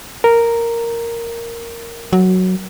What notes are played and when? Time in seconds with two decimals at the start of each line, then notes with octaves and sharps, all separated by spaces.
0.24 A#4
2.13 F#3